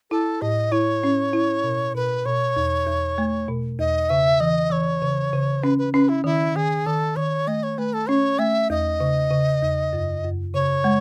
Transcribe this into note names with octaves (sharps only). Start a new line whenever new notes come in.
E4 A4
A2 D#5
E4 C#5
C#4
E4
B2
B2 B4
B2 C#5
E2
E2
A3
B2
E2 D#5
C#3 E5
E3 D#5
E3 C#5
C#3
C#3
C#4 B4
B4
C#4 B4
E4
D#3 E4
D#3 G#4
D#3 A4
D#3 C#5
A3 D#5
C#5
A3 B4
A4
C#4 C#5
A3 E5
E2 D#5
C#3
C#3
E2
F#2
F#2
C#3 C#5
G#3